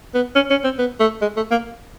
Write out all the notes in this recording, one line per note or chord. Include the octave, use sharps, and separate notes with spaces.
B3
C#4
C#4
C4
B3
A3
G#3
A3
A#3